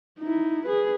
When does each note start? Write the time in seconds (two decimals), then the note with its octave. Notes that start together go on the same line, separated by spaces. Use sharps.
0.19 D#4 E4
0.66 G#4 B4